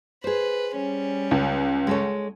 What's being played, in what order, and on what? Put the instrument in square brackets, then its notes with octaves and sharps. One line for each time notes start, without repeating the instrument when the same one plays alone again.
[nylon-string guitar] G#4 C5 [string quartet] B4
[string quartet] G3 C#4
[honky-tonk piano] C#2
[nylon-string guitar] G#3 A4 C#5